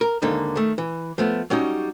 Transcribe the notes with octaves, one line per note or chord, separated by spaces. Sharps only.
A#4
D#2 G#2 D3 A#3 D#4
D#3 A3
E3
F3 A3 B3
F#3 G3 C#4 D#4